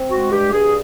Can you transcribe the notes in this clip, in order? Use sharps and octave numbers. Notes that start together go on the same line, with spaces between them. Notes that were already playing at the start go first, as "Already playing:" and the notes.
Already playing: C4
G#3 F#4
G2 G4
G2 G#4